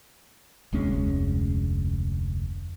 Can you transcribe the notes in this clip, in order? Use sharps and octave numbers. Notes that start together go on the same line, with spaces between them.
F1 D2 G#3 C#4